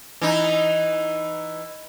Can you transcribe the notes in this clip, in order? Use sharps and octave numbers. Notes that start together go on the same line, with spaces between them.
E3 D#4